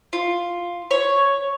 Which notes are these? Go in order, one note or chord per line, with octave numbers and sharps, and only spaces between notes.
F4
C#5